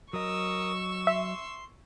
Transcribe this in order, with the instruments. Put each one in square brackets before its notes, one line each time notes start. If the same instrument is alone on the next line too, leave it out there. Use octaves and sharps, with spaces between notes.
[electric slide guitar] F#3 D#5 [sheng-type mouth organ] A#4 D#6 [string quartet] C#6 E6
[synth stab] E5 [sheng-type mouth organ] C6